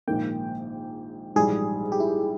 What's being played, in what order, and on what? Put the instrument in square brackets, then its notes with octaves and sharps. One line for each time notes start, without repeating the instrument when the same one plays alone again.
[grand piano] A#1 G#2 D#3 A#3 D#4 [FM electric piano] G5
[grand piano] A#1 G#2 E3 G3 [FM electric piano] G#4
[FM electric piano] G4
E4